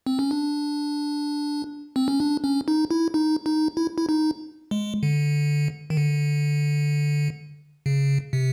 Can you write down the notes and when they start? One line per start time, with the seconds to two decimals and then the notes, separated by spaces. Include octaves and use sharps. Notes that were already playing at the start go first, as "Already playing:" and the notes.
0.07 C4
0.19 C#4
0.31 D4
1.96 C4
2.08 C#4
2.20 D4
2.44 C#4
2.68 D#4
2.91 E4
3.14 D#4
3.46 D#4
3.77 E4
3.98 E4
4.09 D#4
4.71 G#3
5.03 D3
5.90 D#3
5.97 D3
7.86 C#3
8.33 C3